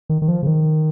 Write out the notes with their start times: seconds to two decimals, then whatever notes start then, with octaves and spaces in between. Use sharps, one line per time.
0.09 D#3
0.22 D#3
0.28 F3
0.43 C#3
0.46 D#3